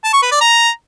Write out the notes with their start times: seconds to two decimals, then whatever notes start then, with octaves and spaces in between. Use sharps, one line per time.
0.04 A5
0.13 C#6
0.23 B4
0.32 D5
0.41 A#5